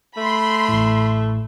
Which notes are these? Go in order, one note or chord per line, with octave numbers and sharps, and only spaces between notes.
A3 B5 C6
A1 A2